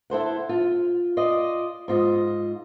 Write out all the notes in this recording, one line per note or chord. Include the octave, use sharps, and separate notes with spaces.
E4 A4 C5 F#5
F4
F4 D5 D#5
G#2 F4 D#5